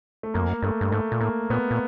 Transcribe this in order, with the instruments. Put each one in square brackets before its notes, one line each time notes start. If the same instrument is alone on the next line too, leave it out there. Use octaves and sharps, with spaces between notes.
[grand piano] A3
[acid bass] F#2 [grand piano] A#3
[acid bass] F2
F#2
[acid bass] G2 [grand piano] A3
[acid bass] G2
[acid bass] G#2 [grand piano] A3
[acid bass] A#2
[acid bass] A2 [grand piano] A#3
[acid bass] A#2 [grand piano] B3
[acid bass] A#2